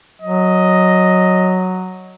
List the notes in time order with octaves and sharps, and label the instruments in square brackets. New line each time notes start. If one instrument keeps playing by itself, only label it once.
[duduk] F#3 [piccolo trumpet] D#5